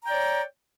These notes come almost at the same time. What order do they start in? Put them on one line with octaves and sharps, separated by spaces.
A#5 G5 D5 C#5